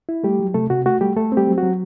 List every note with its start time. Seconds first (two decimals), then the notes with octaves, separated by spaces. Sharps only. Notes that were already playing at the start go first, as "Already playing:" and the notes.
0.09 E4
0.24 G3 A3 G4
0.40 F#3
0.54 C3 A3 A4
0.70 C3 F#4
0.86 A3 F#4
1.01 G3 A3 G4
1.17 A3 A4
1.32 C4
1.37 G3 G4
1.48 F#3
1.58 F#3 F#4